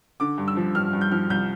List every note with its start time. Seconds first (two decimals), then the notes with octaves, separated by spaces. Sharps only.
0.20 D3 D6
0.38 G2
0.48 E6
0.57 F3
0.75 G2 F6
0.93 G2
1.01 G6
1.12 F3 F6
1.30 C2 G6